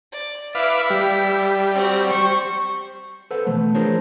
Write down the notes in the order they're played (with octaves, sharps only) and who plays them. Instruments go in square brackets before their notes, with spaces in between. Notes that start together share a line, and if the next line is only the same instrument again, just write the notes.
[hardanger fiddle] D5
[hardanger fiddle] E4 E5 [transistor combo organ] B4 F5 D6
[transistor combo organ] G3
[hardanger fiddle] C4 F#4
C5 C#6
[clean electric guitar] A4 B4 C5 F#5
B2 E3 F3 A3
D4 F4 G#4 A#4 C5 C#5